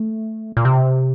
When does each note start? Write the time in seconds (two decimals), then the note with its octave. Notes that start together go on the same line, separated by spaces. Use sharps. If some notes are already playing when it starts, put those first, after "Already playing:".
Already playing: A3
0.57 A#2
0.65 C3